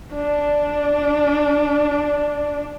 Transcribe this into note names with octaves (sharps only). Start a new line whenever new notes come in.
D4 D5